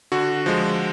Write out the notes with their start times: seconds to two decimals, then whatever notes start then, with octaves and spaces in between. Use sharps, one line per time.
0.12 D3 F#4
0.46 F3 G#3